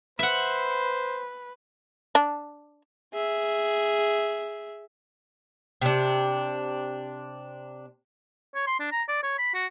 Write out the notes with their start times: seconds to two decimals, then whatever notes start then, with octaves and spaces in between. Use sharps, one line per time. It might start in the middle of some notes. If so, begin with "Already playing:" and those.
0.19 B4 C5 E5 F#5
2.15 D4
3.14 G#4 E5
5.82 C3 D4
8.55 C#5
8.67 C6
8.80 D4
8.92 A#5
9.08 D5
9.23 C#5
9.38 B5
9.54 F#4